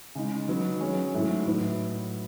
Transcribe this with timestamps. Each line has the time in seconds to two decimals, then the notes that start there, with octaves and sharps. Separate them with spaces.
0.15 C#3 G#3 D#4
0.49 F#3 B3 D#4
0.81 F#3 C#4 G#4 C#5
1.14 G#2 F#3 A3 E4
1.46 A2 F#3 B3